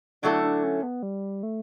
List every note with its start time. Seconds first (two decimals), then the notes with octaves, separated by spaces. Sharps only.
0.22 D3 F#3 A3 D4 E4 A4
0.43 D4
0.64 C#4
0.83 B3
1.03 G3
1.43 A3